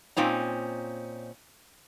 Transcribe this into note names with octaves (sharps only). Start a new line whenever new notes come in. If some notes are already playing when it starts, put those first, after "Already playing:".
A#2 C4 C#4 D#4